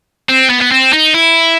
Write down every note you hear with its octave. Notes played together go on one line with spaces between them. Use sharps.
C4
B3
B3
C4
D#4
E4